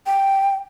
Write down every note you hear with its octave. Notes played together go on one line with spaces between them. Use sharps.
G5